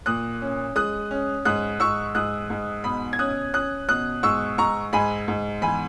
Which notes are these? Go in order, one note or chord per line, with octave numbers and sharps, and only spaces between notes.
A#2 D#6 F#6
C#4
G#3 D#6 F#6
C#4
G#2 D#6 F#6
G#2 C#6 E6
G#2 D#6 F#6
G#2
B2 B5 D#6
G#6
C#4 D#6 F#6
C#4 D#6 F#6
B2 D#6 F#6
G#2 C#6 E6
G#2 A#5 C#6
G#2 G#5 B5
G#2
E2 G#5 B5